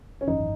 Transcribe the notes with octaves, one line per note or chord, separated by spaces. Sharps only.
C#4
G#1 F#2 E3 D#4